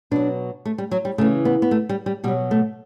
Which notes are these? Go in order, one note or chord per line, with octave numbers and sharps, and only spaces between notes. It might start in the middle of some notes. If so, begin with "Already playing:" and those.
B2 F#3 D4
A3
G3
F#3
G3
C#3 E3 A3
B3
B3
A3
G3
G3
B2 F#3 G3
A3